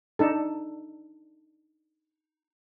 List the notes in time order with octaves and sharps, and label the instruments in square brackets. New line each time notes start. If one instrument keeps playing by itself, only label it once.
[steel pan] D4 D#4 A4